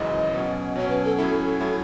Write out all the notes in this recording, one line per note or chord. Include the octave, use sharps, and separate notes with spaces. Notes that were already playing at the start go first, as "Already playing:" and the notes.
Already playing: G#1 F#2 C#3 E3 D#5
B2 F#3 C#4
B2 F#3 C#4 C#5
B4
A4
A2 F#3 C#4 E4 A4
A2 F#3 C#4 E4